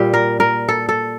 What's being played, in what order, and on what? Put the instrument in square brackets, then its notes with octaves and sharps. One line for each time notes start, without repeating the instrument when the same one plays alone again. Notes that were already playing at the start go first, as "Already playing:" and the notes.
Already playing: [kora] A#2 G3 G4
A#4
A#4
A4
A4